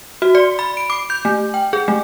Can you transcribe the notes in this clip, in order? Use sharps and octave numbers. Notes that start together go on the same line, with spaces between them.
F#4
D5
B5
D7
D6
G6
A3
G5
G#4
A3